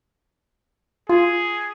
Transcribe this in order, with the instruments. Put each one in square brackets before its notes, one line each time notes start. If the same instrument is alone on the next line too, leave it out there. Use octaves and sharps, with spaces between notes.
[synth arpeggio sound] F4 [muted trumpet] G#4